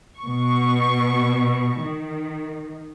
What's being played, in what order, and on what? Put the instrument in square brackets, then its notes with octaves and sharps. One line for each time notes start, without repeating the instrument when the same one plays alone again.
[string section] B2 C#6
D#3